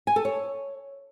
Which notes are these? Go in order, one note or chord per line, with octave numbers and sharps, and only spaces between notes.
G#5
A4
C#5